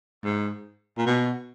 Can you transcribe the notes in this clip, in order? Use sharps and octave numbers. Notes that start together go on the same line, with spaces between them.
G#2
A#2
B2